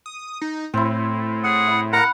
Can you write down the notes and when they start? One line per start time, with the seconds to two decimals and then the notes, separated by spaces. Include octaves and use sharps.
0.06 D#6
0.42 D#4
0.74 A2 C4 E4
1.44 G#4 F#5
1.67 E4
1.93 A#4 F5 F#5 A#5 B5